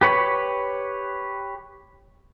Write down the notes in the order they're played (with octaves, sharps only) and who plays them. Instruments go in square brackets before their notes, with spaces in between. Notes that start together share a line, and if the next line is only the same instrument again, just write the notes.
[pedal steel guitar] G4 B4 C#5 B5